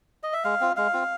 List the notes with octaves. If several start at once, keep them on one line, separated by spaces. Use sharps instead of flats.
D#5
E5
G#3 F5
C4 F4
G#3 F5
C4 F4